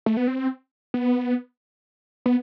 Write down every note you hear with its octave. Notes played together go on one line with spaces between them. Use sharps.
A3
B3
C4
B3
B3